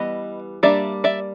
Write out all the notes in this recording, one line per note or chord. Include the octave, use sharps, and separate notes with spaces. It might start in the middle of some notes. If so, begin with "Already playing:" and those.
Already playing: E3 G3 B3 D#5
G3 A#3 D4 D5 E5
D5 E5